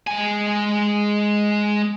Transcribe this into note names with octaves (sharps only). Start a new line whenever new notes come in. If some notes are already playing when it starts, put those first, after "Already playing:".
G#3 G#5